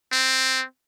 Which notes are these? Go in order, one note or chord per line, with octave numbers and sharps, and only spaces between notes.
C4